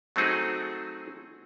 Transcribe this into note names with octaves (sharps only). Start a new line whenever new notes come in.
F#3 A3 C4 D#4 F#4 G#4